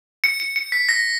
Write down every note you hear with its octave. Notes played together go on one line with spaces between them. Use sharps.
C#7
C#7
C#7
B6
A#6